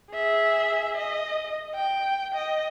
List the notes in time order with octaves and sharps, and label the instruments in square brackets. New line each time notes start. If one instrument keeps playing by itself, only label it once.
[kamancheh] G#4 E5
D#5
G5
D#5